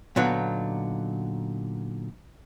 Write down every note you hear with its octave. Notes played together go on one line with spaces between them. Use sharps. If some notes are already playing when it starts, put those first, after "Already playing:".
A#2 D3 F#3 B3 D#4